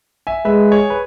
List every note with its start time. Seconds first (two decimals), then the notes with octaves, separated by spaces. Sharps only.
0.27 E5 G#5
0.45 G#3 B4 E5
0.72 G#4 C#5
0.90 B4